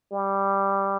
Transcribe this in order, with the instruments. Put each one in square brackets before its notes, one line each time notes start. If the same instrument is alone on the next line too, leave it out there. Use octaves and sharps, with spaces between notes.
[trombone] G3